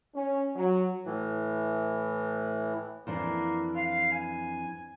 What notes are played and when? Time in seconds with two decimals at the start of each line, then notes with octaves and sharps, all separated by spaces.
0.15 C#4
0.56 F#3
1.04 A2 E3
3.07 F2 E3 A#3 D4
3.76 F5
4.12 G#5